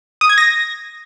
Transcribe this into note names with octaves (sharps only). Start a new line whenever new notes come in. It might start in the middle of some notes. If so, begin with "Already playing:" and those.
D#6
G#6
A#6